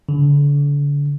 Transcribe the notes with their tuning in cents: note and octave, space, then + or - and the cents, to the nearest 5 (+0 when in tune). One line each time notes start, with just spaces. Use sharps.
D3 -35